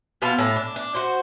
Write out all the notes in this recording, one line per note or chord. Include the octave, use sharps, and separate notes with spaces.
B2 B3 F4 A5
A2 A5
D4
D4
F#4 C5